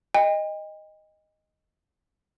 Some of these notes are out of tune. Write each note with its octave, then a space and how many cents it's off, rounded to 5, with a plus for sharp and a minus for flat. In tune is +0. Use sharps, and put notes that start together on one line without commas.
D#5 +0 G5 +45